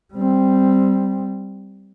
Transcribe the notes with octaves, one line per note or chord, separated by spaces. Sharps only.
G3 C4